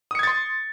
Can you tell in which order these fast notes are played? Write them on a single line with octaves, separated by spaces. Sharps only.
D#6 C#7 G#6 A6 C6